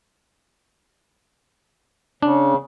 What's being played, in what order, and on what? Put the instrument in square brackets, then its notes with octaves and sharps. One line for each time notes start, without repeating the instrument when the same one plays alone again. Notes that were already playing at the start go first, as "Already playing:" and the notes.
[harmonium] C#3 [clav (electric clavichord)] D4